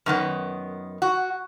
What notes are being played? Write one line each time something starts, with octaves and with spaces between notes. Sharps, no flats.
F#2 D#3 B3
F#4